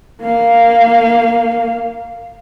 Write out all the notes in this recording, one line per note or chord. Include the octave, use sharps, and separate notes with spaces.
A#3 F5